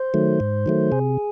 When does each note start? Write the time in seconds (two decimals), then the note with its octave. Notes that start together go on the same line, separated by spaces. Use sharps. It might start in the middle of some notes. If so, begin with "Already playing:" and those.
Already playing: C5
0.14 D#3 F#3 A3
0.40 G#2
0.66 D#3 F#3 A3
0.92 C3 G#4